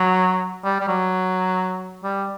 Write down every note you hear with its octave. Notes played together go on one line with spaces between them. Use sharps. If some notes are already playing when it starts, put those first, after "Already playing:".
Already playing: F#3
G3
G3
F#3
G3